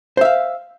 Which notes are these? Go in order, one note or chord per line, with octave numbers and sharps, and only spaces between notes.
C5 E5 F5